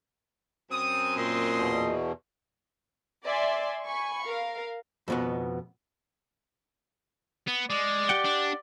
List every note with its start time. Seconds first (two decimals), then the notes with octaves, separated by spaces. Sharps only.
0.70 F#2 C4 D#6
1.17 A#2 D#5 C6 D#6
1.56 E2 B2
3.24 D5 E5 G#5 C6
3.84 G#5 B5 C#6
4.25 A#4 F5
5.08 F2 B2 B3
7.48 B3
7.70 G#3 D5
8.09 G4 F#5 G5
8.25 D4